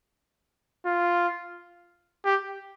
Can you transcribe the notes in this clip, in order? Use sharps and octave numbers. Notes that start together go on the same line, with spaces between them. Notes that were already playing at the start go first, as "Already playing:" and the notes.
F4
G4